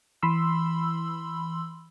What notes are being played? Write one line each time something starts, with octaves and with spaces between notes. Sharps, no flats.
E3 B5 C6 E6